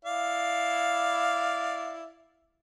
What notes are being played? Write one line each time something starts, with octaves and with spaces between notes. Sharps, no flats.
E4 D5 F5